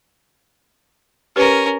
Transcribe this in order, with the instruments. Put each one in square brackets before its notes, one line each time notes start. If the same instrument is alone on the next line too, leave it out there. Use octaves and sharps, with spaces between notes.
[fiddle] C#4 A#4 [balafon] G4 B4